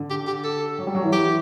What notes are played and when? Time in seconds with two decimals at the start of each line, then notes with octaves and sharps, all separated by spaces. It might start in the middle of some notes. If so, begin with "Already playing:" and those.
Already playing: D3
0.10 G4
0.27 G4
0.44 A4
0.78 F#3
0.87 G3
0.95 F#3
1.04 E3
1.13 G4